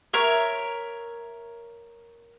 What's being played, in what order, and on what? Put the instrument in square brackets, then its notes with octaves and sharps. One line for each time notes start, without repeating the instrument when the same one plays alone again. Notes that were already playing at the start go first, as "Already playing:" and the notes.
[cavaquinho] A#4 C#5 E5